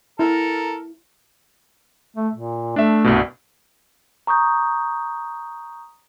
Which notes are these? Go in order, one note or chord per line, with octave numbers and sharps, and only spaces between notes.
E4 A4 A#4
A3
A#2
A3 D4 E5
C2 G2 B2
A#5 C#6 D#6 G6